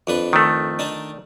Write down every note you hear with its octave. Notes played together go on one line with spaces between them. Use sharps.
F2 D4 B4
D#3 A3
D4 D#4 A5